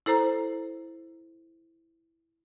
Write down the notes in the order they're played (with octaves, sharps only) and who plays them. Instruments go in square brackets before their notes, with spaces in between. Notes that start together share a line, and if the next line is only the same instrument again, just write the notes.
[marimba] E4 A4 C5 A#5